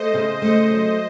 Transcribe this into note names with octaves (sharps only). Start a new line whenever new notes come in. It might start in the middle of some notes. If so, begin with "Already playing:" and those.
Already playing: A3 C5 D#5
C#3
A3 C5 D#5
F#3